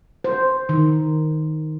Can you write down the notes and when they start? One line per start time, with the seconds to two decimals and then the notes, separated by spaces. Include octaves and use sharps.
0.24 C5
0.69 D#3